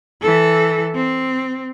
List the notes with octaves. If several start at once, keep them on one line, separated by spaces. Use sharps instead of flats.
E3 A4
C4